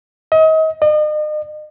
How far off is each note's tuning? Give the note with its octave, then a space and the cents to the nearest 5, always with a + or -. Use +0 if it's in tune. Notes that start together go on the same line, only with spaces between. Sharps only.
D#5 +35
D#5 -40